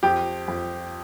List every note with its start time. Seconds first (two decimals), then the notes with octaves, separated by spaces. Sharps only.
0.03 F2 G4
0.48 F2